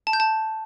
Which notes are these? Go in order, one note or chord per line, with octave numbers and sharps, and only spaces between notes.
A5
G6
A5